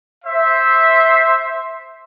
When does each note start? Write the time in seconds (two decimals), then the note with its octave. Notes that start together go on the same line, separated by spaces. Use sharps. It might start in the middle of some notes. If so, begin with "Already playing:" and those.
0.25 C5 E5